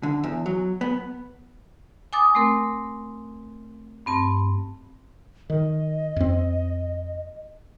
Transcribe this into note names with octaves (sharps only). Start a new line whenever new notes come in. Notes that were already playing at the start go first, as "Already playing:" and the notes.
D3
E2
F#3
B3
G#5 D6 D#6 A6
A3 C4 A#4
G2 C4 A5
D#3 D#5
F2 C4